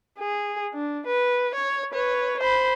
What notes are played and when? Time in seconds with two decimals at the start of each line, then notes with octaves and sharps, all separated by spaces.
0.19 G#4
0.73 D4
1.06 B4
1.55 C#5
1.93 B4 C#5
2.40 C5 B5